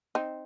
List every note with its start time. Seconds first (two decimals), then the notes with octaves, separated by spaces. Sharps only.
0.15 C4 D#4